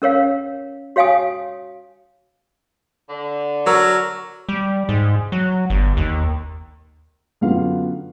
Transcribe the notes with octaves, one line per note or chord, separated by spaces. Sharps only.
C#4 A#4 C#5 F5
F#4 C#5 F5 G5 G#5 D#6
D3
F#3 A#4 E6
G3
G#2
F#3
G1
D#2
F#2 D3 B3 F4 F5